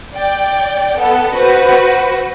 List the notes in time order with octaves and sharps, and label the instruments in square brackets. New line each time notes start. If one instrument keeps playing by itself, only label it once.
[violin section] D5 G5
[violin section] B3 A4 [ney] F#5
[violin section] F#4 B4 [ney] C5